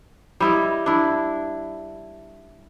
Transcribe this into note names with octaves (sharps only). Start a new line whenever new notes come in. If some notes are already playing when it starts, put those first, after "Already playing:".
G3 E4 D#5
D4 E4